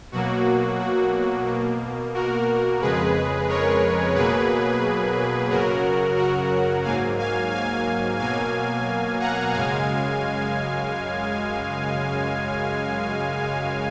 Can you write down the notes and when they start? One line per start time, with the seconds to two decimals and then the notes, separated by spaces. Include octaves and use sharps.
0.12 B2 F#3 A#3 F#4
0.79 F#4
1.46 B2 A#3
2.14 F#4 A#4
2.81 F2 C#3 G#3 G#4 B4
3.48 A#4 C#5
4.15 B2 F#3 A#3 G#4 B4
5.50 F#2 C#3 F#3 F#4 A#4
6.17 F#4 A#4
6.84 G#2 F#3 A#3 F5 G#5
7.19 F5 G#5
7.52 F5 G#5
8.19 B2 F#3 A#3 F5 G#5
9.20 F#5 A#5
9.53 F#2 C#3 G#3 F5 G#5